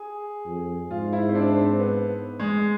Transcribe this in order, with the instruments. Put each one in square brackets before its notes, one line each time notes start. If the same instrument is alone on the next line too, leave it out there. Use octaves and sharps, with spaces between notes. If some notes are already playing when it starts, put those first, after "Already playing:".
Already playing: [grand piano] G#4
[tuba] F2
[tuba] G#2 [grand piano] F4
[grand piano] E4
C4
D4
C4
B3
G#3